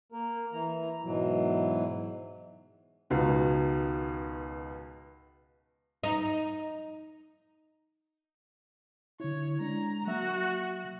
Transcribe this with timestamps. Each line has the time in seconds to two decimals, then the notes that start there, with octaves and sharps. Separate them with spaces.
0.12 A#3 A#4
0.52 E3 A#5
1.04 G#2 B2 E3 F#3
3.10 C#2 B2 D#3 F#4
6.04 D#4
9.20 D3 E4 C#5
9.60 G#3 D4 A#5
10.07 F#3 A#3 F#4 E5